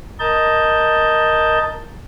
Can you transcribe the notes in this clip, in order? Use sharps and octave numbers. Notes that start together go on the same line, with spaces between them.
A#4 D#5 A5 G6